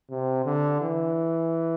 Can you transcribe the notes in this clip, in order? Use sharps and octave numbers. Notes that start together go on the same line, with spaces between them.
C3
D3
E3